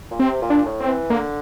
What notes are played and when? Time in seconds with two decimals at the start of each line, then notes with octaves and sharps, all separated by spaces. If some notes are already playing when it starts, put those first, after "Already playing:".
0.11 A#2
0.19 C3 C4
0.42 A#2
0.50 D4
0.66 A2
0.80 C4
0.87 E3
1.10 D3 A#3